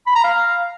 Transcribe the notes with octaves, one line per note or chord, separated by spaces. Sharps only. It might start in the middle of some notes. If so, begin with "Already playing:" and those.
B5
A#5
F5